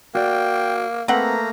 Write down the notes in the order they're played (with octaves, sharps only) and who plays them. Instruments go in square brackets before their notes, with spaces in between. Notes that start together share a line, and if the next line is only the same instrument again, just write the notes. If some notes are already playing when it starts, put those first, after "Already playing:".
[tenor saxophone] A#3 [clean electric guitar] F#4 D5 [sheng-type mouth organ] G5
[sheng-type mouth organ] A3 A#3 A#5 [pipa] C4 F#5 [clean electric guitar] B4